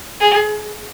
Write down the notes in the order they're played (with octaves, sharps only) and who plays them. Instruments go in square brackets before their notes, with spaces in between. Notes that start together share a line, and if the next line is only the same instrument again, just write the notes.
[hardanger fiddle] G#4